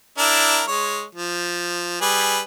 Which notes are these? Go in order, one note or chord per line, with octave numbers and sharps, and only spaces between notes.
D4 E4 A#4
G#3 C#5
F3
G3 G#4 B4